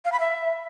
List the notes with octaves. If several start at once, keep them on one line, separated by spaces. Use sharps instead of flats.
F5
B5
E5